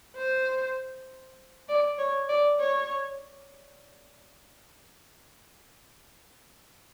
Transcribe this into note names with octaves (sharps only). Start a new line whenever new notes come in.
C5
D5
C#5
D5
C#5